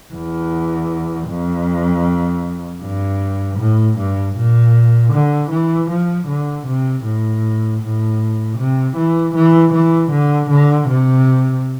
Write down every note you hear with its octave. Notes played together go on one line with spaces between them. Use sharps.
E2
F2
G2
A2
G2
A#2
D3
E3
F3
D3
C3
A2
A2
C3
E3
E3
E3
D3
D3
C3